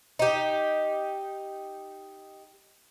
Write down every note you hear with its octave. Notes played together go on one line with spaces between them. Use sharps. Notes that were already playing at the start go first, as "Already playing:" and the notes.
D#4 G4